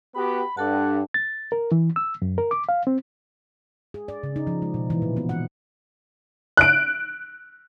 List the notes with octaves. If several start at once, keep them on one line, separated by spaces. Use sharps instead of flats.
B3 F#4 G4 B5
G2 D4 A4 F#5 A5
A6
A#4
E3
E6
F#2
A#4
D6
F5
C4
G#4
D5
C#3
D#4
F3
G#3
B2
E3
A#2
B3
F#5
F#6 D7